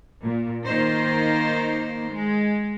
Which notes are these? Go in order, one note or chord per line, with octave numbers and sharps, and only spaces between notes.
A#2
D#3 A#3 D#4 C5
G#3